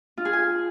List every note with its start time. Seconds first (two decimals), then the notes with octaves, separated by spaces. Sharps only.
0.17 F4
0.25 G#4
0.33 G#5